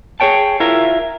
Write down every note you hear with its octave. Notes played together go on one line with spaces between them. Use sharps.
G#4 A#4 C#5 G5 A5
E4 F4 A#4 E5